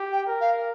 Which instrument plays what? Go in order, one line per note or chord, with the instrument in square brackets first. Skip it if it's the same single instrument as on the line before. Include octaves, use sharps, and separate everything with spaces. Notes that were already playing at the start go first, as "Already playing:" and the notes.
Already playing: [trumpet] G4
[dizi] G5
[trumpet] A#4
[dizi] F5